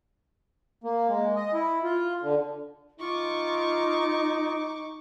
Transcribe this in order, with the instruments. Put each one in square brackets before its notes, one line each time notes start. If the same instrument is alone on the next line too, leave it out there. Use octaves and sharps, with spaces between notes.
[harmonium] A#3
G#3
D#5
E4
F4
D3
[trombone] D#4 [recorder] F4 [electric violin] C#6 D6